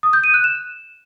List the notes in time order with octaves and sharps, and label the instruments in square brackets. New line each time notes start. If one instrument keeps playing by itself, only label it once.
[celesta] D#6
G6
D#7
F#6
E7